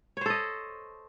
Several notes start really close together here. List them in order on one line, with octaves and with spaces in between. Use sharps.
C#5 C5 A4 D#5